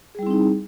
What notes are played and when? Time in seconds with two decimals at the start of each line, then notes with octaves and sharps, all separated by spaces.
0.15 G#4
0.19 G3
0.23 E4
0.27 C4
0.31 D#4